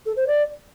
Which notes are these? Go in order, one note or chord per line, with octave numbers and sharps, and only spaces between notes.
A4
C5
D5